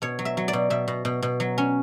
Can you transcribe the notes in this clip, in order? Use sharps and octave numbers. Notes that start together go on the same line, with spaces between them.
B2 C#5
F#3
E5
F#3
D5
B2
B2 E5
B2
B2
B2
F#3
C#4